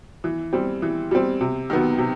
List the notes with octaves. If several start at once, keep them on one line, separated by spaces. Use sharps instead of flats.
E3
G3 C4
E3
G3 C4
C3
D#3 F#3 B3
C3